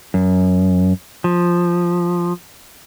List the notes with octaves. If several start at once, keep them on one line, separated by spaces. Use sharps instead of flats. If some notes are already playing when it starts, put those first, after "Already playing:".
F#2
F3